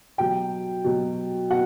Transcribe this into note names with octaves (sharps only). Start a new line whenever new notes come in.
B2 F#3 G5
B2 F#3
B2 F#5